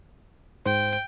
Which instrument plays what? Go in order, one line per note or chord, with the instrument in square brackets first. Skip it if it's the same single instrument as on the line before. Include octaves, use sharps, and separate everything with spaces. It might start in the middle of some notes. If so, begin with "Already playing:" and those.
[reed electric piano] G#2 C5 [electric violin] G5